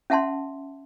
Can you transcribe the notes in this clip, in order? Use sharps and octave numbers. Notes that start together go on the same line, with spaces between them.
C#4 E5 F#5 A5 C6